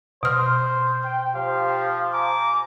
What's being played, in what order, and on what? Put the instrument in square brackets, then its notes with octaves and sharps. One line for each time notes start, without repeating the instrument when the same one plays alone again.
[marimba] B2 F6 [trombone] C5
[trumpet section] G5
[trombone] F3 [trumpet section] G4 C5 F5
[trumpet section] G#5 A#5 D6